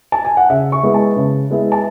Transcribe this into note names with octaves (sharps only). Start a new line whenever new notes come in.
A5
G#5
F#5
C#3 E5
C#6
G#3 B3 E4
A5
C#3
G#3 B3 E4
A5